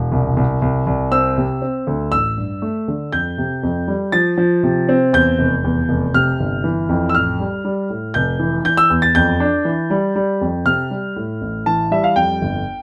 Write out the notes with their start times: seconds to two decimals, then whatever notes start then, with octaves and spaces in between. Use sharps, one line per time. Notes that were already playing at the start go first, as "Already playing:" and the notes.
Already playing: E1
0.12 C2
0.37 C2
0.62 C2
0.87 C2
1.12 C4 E6
1.37 C3
1.62 C4
1.87 D2
2.12 A1 E6
2.38 G2
2.62 A3
2.88 D3
3.12 F2 G6
3.38 C3
3.63 F2
3.88 G3
4.12 F3 A6
4.38 F3
4.63 C3
4.89 C4
5.13 E2 G6
5.39 F1
5.64 E2
5.89 F1
6.14 C3 F6
6.40 G1
6.64 E3
6.89 F2
7.09 E6
7.15 A1 F6
7.40 G3
7.65 G3
7.90 A2
8.14 F1 G6
8.39 E3
8.65 E3 G6
8.77 E6
8.90 E2
9.02 A6
9.15 F2 G6
9.40 D4
9.65 E3
9.90 G3
10.16 G3
10.41 F2
10.65 C3 F6
10.90 G3
11.16 A2
11.41 A1
11.66 E3 A5
11.91 G3 E5
12.04 F5
12.16 F2 G5
12.41 G1